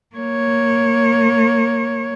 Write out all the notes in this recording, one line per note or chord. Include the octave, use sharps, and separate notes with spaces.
A#3 C#5